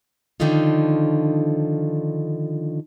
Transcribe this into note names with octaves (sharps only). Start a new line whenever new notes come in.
D3 D#3 F3 D#4 F4